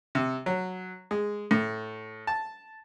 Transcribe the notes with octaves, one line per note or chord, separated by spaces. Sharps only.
C3
F#3
G#3
A2
A5